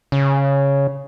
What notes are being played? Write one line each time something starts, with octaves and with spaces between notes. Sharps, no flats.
C#3